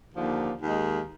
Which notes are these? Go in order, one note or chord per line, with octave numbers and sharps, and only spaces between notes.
D#2 D3 F3 A#3
D#2 D#3 G#3